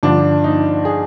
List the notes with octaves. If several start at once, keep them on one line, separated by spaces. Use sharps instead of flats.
G2 D3 F3 D4
D#4
G#4